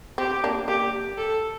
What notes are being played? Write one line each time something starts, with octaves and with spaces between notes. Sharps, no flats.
C4 G4
A#3 D4
A#3 D4 G4
A4